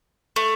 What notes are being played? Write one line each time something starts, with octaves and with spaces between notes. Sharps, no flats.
A3